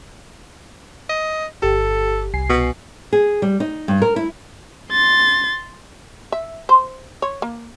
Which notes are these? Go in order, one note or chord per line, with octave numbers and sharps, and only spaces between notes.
D#5
G1 G4 A4
C2 G#5 C7
B2
G#4
G3
D#4
G2
A#4
E4
C6 A6
E5
C5
C#5
A#3